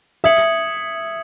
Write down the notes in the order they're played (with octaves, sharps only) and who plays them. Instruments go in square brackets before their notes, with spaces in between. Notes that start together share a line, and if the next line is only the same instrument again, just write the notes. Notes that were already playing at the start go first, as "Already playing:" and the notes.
[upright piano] E5 [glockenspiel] D#6 G#6 C#7 F#7